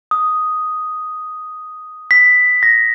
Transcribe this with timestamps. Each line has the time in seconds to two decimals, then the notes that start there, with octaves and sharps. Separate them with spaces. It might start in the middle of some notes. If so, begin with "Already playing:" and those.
0.11 D#6
2.11 B6
2.63 A#6